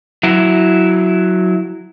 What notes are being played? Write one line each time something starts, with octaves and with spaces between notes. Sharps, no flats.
F#3 E4